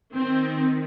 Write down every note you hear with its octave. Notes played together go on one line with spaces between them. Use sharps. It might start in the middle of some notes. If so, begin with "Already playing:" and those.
D#3 C4